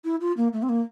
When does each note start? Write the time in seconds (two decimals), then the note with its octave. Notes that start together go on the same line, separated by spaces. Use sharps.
0.04 E4
0.21 F4
0.37 A#3
0.53 A3
0.63 C4
0.69 A#3